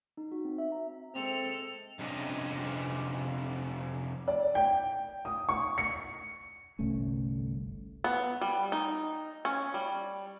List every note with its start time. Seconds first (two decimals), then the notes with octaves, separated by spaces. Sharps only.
0.17 D#4
0.32 F#4
0.45 C4
0.58 E5
0.72 A#5
1.15 G#3 C4 A4 F7
1.99 F2 C3 C#4 D4 D#5
4.28 D5
4.55 G5
5.25 D#6
5.49 C#6
5.78 C#7
6.79 G1 C2 A3 C#4
8.04 B3
8.41 G3
8.72 D#4
9.45 C#4
9.74 G3